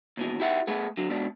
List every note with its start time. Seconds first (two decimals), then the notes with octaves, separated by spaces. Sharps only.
0.17 D#2 B2 E3
0.40 E4 G4 E5 F#5
0.67 A3 B3 G#4
0.97 D3 F#3
1.10 G#2 B2 D4